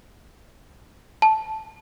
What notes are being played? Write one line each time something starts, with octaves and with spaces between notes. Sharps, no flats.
A5